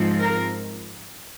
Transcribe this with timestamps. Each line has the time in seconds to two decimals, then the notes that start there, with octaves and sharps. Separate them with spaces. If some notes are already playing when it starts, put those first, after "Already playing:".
Already playing: G#2 F3 G#3 C4
0.21 A#4